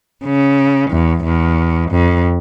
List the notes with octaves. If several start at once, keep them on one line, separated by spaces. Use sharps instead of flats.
C#3
E2
E2
F2